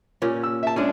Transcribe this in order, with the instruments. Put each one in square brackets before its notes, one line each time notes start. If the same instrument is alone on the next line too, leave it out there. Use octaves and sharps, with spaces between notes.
[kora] A#2 C#4 G4
[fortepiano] E6
E5 A5
[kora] G#3 G#4 [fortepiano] C#4 D4